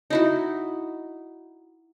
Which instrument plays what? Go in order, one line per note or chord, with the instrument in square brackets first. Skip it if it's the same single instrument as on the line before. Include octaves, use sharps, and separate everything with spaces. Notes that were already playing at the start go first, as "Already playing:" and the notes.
[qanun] D#4 E4 F#4